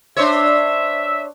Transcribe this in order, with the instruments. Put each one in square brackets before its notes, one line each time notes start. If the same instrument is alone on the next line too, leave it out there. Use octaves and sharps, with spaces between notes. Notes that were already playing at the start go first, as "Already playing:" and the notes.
[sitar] D4 C5 C#5 [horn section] E5